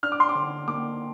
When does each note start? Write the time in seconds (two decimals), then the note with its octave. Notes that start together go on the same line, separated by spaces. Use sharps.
0.03 D4 F6
0.12 D6
0.20 C6
0.29 D6
0.35 D3
0.68 A#3 D6